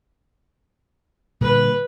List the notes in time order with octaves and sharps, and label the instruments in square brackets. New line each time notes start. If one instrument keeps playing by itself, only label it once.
[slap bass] A#2 D3 G3 [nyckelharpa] B4